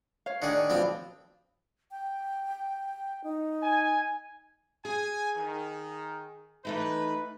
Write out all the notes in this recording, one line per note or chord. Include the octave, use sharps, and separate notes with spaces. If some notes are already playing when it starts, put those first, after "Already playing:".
C#5 F5
D#3 D4 G#4 F#5
D4
B1 F3 C4
G5
D#4
G#5
G#4 G#5
D#3
E3 A3 D#4 B4